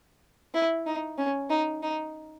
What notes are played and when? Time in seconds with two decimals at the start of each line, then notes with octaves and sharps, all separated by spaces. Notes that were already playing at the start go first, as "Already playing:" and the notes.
0.54 E4
0.86 D#4
1.18 C#4
1.50 D#4
1.83 D#4